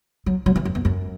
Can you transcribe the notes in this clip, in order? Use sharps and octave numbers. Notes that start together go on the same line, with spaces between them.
F#3
F#3
E3
F#2
E2
F#2